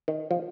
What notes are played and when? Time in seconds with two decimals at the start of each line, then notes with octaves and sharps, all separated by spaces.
0.08 D#3
0.31 F3